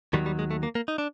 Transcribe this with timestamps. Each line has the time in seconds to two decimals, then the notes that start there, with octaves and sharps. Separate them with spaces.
0.13 D#2 D#3 F#3 G3
0.26 G3
0.39 G#3
0.51 A3
0.63 A#3
0.75 A#3
0.88 D#4
0.98 D4